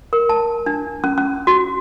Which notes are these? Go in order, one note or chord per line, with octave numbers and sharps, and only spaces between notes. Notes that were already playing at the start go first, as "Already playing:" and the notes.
A#4
A5
D4
C#4
C#4
F#4